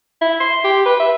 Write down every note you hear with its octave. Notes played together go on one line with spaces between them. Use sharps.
E4
C6
G4
B4
E5